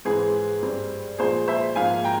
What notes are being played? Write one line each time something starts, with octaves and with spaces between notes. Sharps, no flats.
G#2 E3 G#3 C4 G#4
G2 G3 C4
A#2 F3 G#3 G#4 C5
C5 E5
G#2 F3 A#3 F5 G#5
G5 A#5